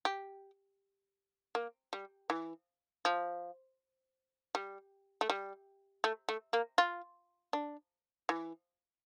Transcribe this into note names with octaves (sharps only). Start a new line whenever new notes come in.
G4
A#3
G3
E3
F3
G3
A3
G3
A3
A3
A#3
F4
D4
E3